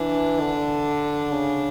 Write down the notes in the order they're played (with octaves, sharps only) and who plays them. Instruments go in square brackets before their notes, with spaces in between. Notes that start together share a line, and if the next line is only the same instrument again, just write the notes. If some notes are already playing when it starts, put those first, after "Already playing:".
Already playing: [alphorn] E3 [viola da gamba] D4
[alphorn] D3
C#3